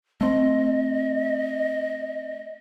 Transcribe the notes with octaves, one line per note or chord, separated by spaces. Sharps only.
A3 C4 D#5